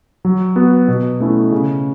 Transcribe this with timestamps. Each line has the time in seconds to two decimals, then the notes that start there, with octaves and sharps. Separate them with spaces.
0.25 F#3
0.56 B3 F#4
0.88 B2
1.20 A3 C#4 E4
1.52 C#3